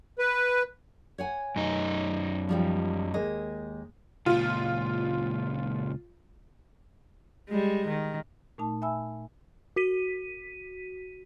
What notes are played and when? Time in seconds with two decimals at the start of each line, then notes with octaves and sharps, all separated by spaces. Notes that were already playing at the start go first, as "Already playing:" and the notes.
0.19 B4
1.18 C#5 F#5 G#5
1.56 F#2 D#4
2.49 F3 G3 G4
3.14 D#2 G#3 D#5
4.26 C#2 A#2 F4
7.49 G3 G#3
7.87 D#3
8.58 A#2 A3 D#4 A5
8.82 E5 G#5 B5 E6
9.76 F#4 B6 D#7